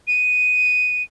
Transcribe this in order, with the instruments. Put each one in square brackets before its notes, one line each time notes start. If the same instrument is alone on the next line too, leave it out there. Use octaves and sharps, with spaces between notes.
[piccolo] D#7